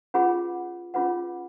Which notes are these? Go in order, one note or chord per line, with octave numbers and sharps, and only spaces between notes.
C#4 F4 G#4 B4 F#5
C#4 F4 G#4 B4 F#5